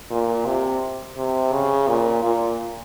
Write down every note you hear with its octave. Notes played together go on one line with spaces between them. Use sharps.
A#2
C3
C3
C#3
A#2
A#2